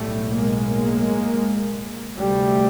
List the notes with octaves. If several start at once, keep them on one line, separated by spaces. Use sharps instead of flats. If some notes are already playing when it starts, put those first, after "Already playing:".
Already playing: B1 A2 G3 A3
G#3 A#3
D2 C3 G3 A3